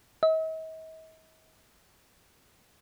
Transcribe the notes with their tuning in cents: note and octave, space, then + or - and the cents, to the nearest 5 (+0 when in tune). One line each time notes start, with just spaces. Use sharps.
D#5 +45